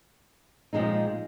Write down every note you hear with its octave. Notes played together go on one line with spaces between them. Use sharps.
A#2 F3 G#3 C4 D#4